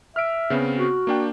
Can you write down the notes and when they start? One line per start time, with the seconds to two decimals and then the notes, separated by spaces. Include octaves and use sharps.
0.16 E5 F6 D7
0.50 C#3 B3 C4
0.78 F#4
1.07 A#3 D4 G5